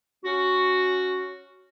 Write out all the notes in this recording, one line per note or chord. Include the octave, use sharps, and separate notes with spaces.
C#4 F#4